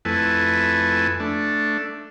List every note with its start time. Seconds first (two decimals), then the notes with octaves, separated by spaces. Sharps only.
0.05 F2 A3 E4 B4 G#5 A5
1.20 A3 D4